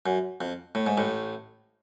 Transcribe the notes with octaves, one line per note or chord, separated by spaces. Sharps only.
F#2
F2
A2
G#2
A1 A2